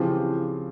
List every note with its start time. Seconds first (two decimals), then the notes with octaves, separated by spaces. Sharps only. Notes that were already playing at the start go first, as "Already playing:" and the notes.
Already playing: C#3 E3 F3 C4 G4 C5